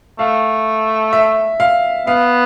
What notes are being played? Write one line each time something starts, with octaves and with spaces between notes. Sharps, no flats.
A3 F5
E5
F5
B3 F5